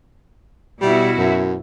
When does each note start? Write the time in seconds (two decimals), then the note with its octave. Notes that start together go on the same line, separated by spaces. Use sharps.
0.81 B2 G3 E4 F#4
1.18 F#2